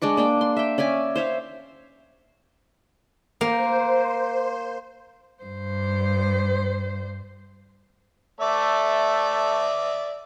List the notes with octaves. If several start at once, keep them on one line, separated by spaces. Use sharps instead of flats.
G#3 D4 D5 C#6
A#3 D4 G5
C6
E5 G5
C#4 D5 E5 G#5
C5 C#5 E5 F5
A#3 C5
G2 C5
A3 D5 E5